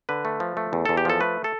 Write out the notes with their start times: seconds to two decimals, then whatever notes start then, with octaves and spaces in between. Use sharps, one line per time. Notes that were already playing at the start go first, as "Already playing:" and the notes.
0.09 D3 B4
0.25 A3
0.40 F3
0.57 A3
0.73 E2
0.85 E2 A4
0.97 G4
1.05 F3 A4
1.20 A3 B4
1.44 A4